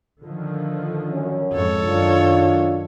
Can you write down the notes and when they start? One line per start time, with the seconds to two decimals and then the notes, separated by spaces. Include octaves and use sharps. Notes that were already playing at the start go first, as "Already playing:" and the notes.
0.23 D3 D#3 F3
1.11 F#2 C#4
1.54 F2 G#2 A4 C#5
1.85 F#2 D#3 F#3 D4 F4